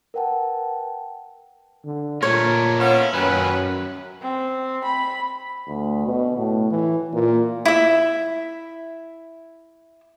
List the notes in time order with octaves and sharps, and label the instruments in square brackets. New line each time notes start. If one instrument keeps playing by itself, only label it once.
[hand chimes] A#4 B4 F#5 G5 A5
[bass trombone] D3
[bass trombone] A#2 [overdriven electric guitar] A3 A#4 [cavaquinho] C#5
[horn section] B3 C#4 F4 [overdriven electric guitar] E4
[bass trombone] F#2 [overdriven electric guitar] D#3 C#4 [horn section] B4
[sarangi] C4
B5
[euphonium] D2
B2
A2
E3
A#2
[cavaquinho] E4 E5